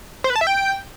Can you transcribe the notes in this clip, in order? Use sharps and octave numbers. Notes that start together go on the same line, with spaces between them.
C5
B4
A5
E5
G5